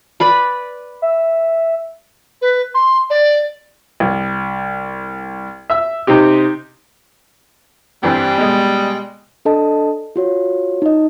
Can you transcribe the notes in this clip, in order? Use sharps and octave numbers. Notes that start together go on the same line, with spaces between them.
B4 D5 B5
E5
B4
C6
D5
C2
E5 E6
C3 C4 D#4 G4
G2 E3 G3 C4
B2 G#3
D4 A4 D#5 A5
F4 F#4 C#5
D#4 D#5